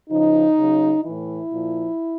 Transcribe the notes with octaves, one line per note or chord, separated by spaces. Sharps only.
C#3 F3 D#4
C#3 F#3
A2 E3 E4
A#2 F3